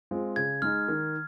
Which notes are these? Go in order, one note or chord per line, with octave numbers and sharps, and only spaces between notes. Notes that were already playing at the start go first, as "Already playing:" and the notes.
G#3 C4 F4
C#3 G#6
G#3 D#4 F6
D#3